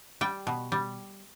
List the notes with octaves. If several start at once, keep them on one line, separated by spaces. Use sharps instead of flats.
G3 G5
B2
G3